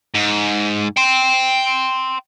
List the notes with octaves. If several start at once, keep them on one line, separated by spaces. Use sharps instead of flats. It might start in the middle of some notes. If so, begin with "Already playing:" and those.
G#2
G5 C6